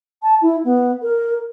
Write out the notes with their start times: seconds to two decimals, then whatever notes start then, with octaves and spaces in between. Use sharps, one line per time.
0.22 A5
0.42 E4
0.65 B3
1.02 A#4